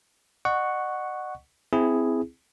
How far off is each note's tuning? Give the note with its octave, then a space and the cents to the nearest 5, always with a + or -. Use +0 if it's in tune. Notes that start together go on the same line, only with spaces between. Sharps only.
D#5 -45 F#5 +0 C#6 +0
C4 -20 E4 +0 G#4 +0